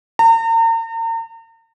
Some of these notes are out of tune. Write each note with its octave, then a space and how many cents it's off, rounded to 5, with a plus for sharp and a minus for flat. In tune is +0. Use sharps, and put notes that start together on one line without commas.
A#5 -40